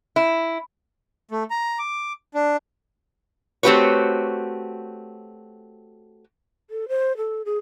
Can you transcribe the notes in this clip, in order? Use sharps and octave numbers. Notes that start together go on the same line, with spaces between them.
E4
A3
A#5
D6
D4
A3 C4 F#4 G4 B4 C#5
A4
C5
A4
G#4